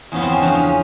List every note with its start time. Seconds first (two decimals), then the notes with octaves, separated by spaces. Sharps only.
0.12 E2 C#3 F3 B3
0.22 C4
0.32 C#4
0.41 E2 C#3 F3 D4
0.55 C#4